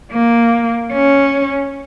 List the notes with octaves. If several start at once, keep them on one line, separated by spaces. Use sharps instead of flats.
A#3
C#4